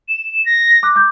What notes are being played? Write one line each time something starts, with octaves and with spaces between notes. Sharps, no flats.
E7
A#6
D6 F#6
D6 G6